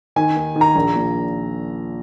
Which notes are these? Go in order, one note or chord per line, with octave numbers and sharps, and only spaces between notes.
D#3 G#5
D#2
D#3
A#5
A#1
A#2